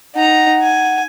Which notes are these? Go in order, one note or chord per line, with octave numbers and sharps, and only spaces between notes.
D#4 F#5 A#5
G#5